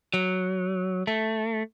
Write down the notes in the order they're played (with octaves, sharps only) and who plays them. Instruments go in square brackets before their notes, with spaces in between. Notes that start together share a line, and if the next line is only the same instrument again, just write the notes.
[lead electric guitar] F#3
A3